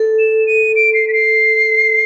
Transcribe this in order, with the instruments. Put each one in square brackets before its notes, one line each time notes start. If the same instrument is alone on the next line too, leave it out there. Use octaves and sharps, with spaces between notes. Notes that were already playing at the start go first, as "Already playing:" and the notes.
Already playing: [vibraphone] A4
[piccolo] E7
D#7
D7
C7
B6
C7